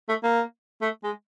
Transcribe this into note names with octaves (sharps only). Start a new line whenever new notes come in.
A3
A#3
A3
G#3